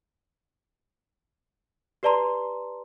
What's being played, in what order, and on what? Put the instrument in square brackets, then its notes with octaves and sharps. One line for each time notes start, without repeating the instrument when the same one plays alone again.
[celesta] G4 B4 D5 A5 A#5 C6